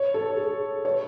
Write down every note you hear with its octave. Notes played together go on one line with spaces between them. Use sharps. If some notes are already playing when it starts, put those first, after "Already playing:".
Already playing: C#5
A4
G#4
C#5